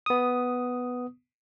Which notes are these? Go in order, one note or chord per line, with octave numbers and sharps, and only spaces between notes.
B3 D#6